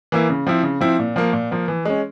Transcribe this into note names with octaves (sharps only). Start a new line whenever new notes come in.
E3 A#3 E4
C#3
F3 C4 E4
C#3
F3 C4 E4
A#2
F3 A#3
A#2
F3 A#3
E3
G#3 C#4